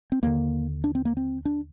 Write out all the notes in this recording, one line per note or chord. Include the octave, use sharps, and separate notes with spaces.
C4
D#2 D3 A#3
D4
C4
A#3
C4
D4